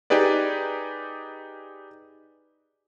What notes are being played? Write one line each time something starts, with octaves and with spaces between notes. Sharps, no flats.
D#4 G4 G#4 B4 D5